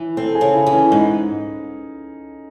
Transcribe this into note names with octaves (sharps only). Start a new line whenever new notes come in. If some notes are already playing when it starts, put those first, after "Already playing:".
Already playing: E3
C4 A4
G#4
C#3
E4
E3
C#4
G#2 D#4